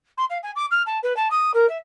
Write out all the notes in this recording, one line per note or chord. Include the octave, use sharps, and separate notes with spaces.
C6
F5
G#5
D6
F6
A5
B4
A5
D#6
A#4
E5